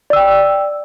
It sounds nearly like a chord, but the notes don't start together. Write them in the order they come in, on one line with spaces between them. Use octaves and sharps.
D5 E6 G5